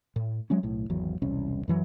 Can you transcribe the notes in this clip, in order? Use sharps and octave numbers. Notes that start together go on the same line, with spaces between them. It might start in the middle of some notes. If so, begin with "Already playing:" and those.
A2
F#3 G#3 C#4
B1 A2
G#1 E2 F#3
E1 C2 C#4
F#2 E3 F#3